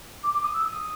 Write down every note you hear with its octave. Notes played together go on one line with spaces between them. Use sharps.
D6
D6
D#6
E6
D#6